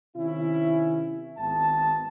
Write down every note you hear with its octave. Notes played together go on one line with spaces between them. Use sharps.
C3 D#3 C#4 E4
G#1 B3 A5